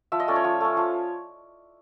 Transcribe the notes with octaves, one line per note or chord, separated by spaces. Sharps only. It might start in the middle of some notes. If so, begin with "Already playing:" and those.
F3 E5
D#5
A3 C#4 D5
C#5
F3
A3 C#4
F3